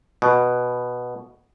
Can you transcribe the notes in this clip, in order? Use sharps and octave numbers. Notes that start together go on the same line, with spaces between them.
B2